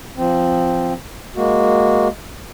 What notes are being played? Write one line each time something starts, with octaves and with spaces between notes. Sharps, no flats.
F3 C4
G#3 A#3 F#4